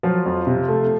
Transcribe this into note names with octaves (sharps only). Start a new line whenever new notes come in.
F3 F#3 F4
F2
C3
A3